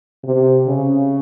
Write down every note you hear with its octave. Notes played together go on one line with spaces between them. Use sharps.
C3
C#3